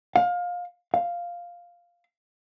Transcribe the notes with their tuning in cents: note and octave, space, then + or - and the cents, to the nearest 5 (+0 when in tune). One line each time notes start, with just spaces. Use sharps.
F5 +25
F5 +0